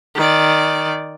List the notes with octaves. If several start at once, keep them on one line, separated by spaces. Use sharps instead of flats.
D#3 D5